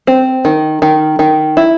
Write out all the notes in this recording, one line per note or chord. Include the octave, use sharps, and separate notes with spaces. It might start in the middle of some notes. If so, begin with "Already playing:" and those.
C4
D#3
D#3
D#3
E4